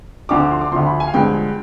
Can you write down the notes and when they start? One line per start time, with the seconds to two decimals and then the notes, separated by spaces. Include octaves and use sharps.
0.29 D2 D3 F3 D6
0.40 D6
0.51 C6
0.61 D6
0.71 D2 D3 F3 C6
0.86 B5
1.00 G#5
1.07 F5
1.14 G2 D3 F3 G#3 G5